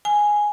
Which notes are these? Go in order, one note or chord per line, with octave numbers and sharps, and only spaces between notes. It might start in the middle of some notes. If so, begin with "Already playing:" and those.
G#5